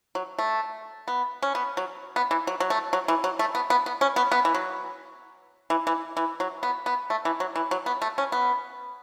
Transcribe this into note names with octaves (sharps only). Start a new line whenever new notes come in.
F#3
A3
B3
C#4
B3
F#3
B3
E3
F#3
F#3
A3
F#3
E3
F#3
A3
B3
B3
B3
C#4
B3
B3
E3
F#3
E3
E3
E3
F#3
B3
B3
A3
E3
F#3
E3
F#3
B3
A3
C#4
B3